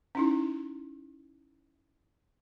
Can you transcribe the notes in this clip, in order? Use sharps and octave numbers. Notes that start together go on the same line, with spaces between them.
C#4 D#4 E4